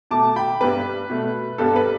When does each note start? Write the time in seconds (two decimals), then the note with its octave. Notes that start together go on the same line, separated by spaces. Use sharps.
0.11 B2 A3 A5 D6
0.36 G5 B5
0.61 G2 G3 B3 B4
1.10 B2 A3
1.58 G2 G3 B3 A4
1.76 B4